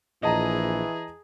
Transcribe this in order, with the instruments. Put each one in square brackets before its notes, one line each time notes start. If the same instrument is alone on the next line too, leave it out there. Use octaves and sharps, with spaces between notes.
[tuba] A#1 [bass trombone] E3 [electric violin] G#4 [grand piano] D#5 A5 A#5